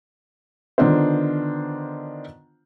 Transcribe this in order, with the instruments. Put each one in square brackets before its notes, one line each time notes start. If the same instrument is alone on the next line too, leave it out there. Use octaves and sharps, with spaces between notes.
[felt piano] D3 D#3 B3 D4 F4 C5